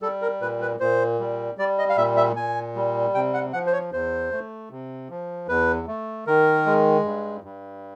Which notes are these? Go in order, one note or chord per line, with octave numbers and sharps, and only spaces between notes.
G3 A4
A#4
A#2 B4
B4
A#2 C5
G3
G3 D5
D#5
F5
A#2 E5
E5
A#2 G#5
G3
C3 G5
F#5
F3 F#5
C5
C#5
E2 C5
A3
C3
F3
E2 B4
A3
D#3 A#4
G#3
G2
G2